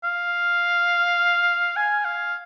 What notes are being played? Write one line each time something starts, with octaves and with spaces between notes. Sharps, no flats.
F5
G#5
F5